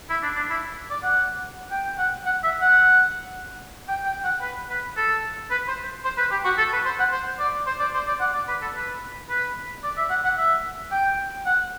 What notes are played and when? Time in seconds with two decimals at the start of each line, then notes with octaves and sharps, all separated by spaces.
0.10 E4
0.23 D4
0.36 D4
0.50 E4
0.91 D5
1.03 F#5
1.71 G5
1.98 F#5
2.26 F#5
2.44 E5
2.62 F#5
3.88 G5
4.06 G5
4.24 F#5
4.41 B4
4.70 B4
4.97 A4
5.51 B4
5.68 C5
6.05 C5
6.18 B4
6.31 G4
6.45 F#4
6.58 A4
6.73 B4
6.85 C5
6.99 F#5
7.12 C5
7.39 D5
7.67 C5
7.80 D5
7.94 C5
8.08 D5
8.20 F#5
8.34 D5
8.48 B4
8.62 A4
8.75 B4
9.30 B4
9.84 D5
9.97 E5
10.10 F#5
10.24 F#5
10.37 E5
10.91 G5
11.46 F#5